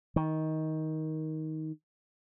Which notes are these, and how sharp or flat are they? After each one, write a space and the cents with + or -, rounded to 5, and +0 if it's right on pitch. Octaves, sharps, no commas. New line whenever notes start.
D#3 +15